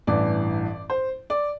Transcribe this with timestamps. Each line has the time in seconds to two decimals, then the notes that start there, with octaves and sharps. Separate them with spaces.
0.07 A1 G2 E3 D5
0.90 C5
1.30 D5